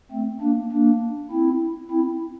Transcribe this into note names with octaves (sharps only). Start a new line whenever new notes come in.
A3 C4
A#3 D4
A#3 D4
C4 E4
C4 E4